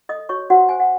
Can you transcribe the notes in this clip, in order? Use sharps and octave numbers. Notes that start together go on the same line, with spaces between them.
A4 D#5 D#6
F#4 C#5 C#6
F#4 C5 F#5
C5 G#5
F#5